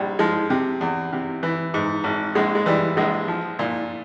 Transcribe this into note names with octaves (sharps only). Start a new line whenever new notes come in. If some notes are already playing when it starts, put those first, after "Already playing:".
Already playing: A#1 G3
F3 G#3
C3
E2
C3
E3
G#2
G#1
A#1 G#3
G#3
E3 G3
A#1 G#3
F3
A#2